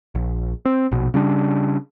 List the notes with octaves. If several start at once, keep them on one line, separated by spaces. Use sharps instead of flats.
A#1
C4
A#1 B2
C#3 G3 D4